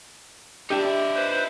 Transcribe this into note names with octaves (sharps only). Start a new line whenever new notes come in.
D4 D#4 G4 E5
B4 C5